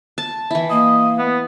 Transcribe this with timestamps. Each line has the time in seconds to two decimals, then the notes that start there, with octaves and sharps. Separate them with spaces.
0.18 A5
0.51 E3 E4
0.70 A#3 D#5
1.18 B3